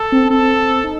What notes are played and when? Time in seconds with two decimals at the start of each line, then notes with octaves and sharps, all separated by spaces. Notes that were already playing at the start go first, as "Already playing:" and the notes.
Already playing: A4
0.12 C4
0.30 C4 A4
0.84 D#4